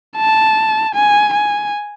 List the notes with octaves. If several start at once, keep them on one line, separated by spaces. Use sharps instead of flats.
A5
G#5
G#5